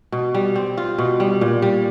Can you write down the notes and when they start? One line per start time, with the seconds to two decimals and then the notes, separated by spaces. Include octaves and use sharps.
0.12 B2
0.35 G3
0.56 C4
0.78 F4
0.98 B2
1.20 G3
1.41 A#2
1.62 G3